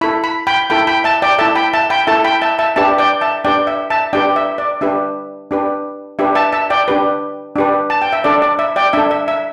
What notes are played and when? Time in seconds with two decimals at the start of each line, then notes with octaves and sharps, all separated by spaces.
0.01 E4 A4 B5
0.24 B5
0.47 G5 B5
0.70 E4 A4 G5 B5
0.87 G5 B5
1.04 E5 A5
1.22 D5 G5
1.39 E4 A4 E5 A5
1.55 G5 B5
1.74 E5 A5
1.90 G5 B5
2.07 E4 A4 E5 A5
2.24 G5 B5
2.42 E5 A5
2.59 E5 A5
2.76 D4 G4 B4 E5 A5
2.98 D5 G5
3.21 E5 A5
3.45 D4 G4 B4 D5 G5
3.67 E5
3.90 E5 A5
4.13 D4 G4 B4 D5 G5
4.36 E5
4.58 D5
4.81 D4 G4 B4 E5
5.51 D4 G4 B4
6.19 D4 G4 B4 E5
6.35 E5 A5
6.53 E5 A5
6.70 D5 G5
6.88 D4 G4 B4
7.56 D4 G4 B4
7.90 A5
8.02 G5
8.13 E5
8.24 D4 A4 D5
8.42 D5
8.59 E5
8.76 D5 G5
8.93 D4 A4 E5
9.11 E5
9.28 E5